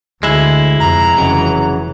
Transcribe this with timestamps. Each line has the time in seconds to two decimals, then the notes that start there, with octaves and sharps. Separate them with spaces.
0.23 D2 G#3 E4
0.80 F2 C3 A#5
1.18 F1 C#3 E3 F#3